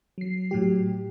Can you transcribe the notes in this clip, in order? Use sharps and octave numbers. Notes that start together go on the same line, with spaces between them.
F#3 C7
A2 F#3 G4